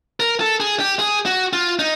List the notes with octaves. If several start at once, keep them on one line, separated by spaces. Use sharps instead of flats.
A#4
A4
G#4
G4
G#4
F#4
F4
D#4